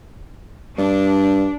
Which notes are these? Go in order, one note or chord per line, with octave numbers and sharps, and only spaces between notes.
G2 D4